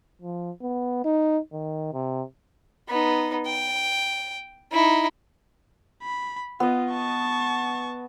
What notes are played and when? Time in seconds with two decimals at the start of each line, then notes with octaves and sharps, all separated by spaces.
0.22 F3
0.62 B3
1.04 D#4
1.52 D#3
1.93 C3
2.88 B3 D#4
3.47 G5
4.72 D#4 E4
6.03 B5
6.60 B3 F4 D#5
6.91 A5 C#6